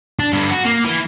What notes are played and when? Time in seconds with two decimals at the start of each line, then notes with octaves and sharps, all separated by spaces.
0.19 D4
0.33 G2 D3
0.51 F#4
0.65 A#3
0.85 E3